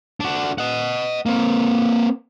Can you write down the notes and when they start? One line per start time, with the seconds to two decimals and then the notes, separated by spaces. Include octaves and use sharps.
0.20 D4 F#4
0.58 D#5 F#5
1.26 A#3 C4